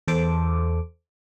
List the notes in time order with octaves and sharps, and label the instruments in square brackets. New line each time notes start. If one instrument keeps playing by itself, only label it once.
[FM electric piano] E2 A4 C5 D6